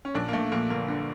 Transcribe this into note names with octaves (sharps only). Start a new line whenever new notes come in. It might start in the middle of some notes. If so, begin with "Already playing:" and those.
C#4
A#1 D4
A#3
A#1 A3
A#1 A#3
G1 A#3
D3